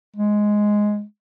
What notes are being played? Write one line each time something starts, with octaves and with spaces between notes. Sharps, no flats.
G#3